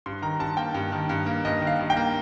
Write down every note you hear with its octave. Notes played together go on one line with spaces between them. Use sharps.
G2 C6
D#3 A#5
G2 A5
A#3 G5
G2
D#3
G2
A#3
G2 D#5
D#3
F5
G2
G5
A#3